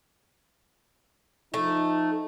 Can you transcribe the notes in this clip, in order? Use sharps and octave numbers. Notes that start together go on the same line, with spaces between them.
F3 A3 D#4